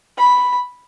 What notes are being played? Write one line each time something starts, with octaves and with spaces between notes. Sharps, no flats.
B5